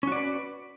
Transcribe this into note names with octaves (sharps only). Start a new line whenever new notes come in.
C#4 F#4 B4 D5